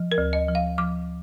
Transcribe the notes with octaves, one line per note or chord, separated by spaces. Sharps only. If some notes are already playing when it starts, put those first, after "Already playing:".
Already playing: F3
A#4
D2
D#5
F3
F5
F3 D6